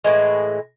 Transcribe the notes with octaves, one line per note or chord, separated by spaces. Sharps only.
A2 E3 G#3